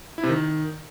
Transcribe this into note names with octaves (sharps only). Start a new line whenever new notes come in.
E4
C3
D#3